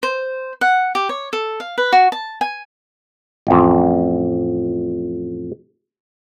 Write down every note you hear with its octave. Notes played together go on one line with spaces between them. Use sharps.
C5
F#5
G4
C#5
A4
F5
B4
F#4
A5
G#5
A1 F2